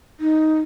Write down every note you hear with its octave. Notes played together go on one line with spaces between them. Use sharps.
D#4